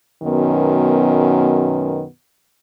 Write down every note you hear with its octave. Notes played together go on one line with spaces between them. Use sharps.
F#2 B2 D#3 B3